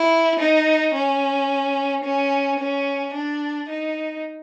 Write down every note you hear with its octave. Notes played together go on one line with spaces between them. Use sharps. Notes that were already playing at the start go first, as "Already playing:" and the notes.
Already playing: E4
D#4
C#4
C#4
C#4
D4
D#4